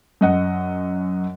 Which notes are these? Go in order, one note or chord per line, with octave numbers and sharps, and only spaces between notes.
F#2 D#5 F#5